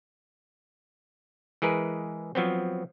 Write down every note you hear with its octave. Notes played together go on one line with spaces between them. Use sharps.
E3 G#3 G#4 A#4 B4
F3 F#3 B3 C4